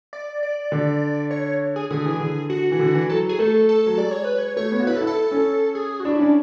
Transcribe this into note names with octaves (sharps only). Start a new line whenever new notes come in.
D5
D5
D3
C#5
G#4
D3 G#4
E3
D3
F#4
E3
D3
E3
F#3 A4
G#4
A3 A4
A4
F#3
G#3 D5
C#5
B4
C#5
A3 C#5
B3
F#4
E4 B4
A4
E4
A4
C#4
G#4
F#4
D4 E4
C#4 D4